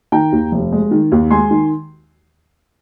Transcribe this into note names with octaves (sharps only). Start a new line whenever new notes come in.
D#3 G5 A#5
D#2
F1
G#3
D#3
D#2
G#3 G#5 C6
D#3